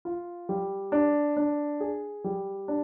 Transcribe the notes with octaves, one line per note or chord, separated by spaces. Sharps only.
F4
G3
D4
D4
G#4
G3
D4